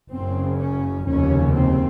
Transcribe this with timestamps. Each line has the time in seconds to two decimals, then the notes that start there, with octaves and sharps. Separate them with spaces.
0.11 F#1 F#2 C#3 C4
0.59 C#4
1.07 F1 D#2 C#3 C#4
1.54 C4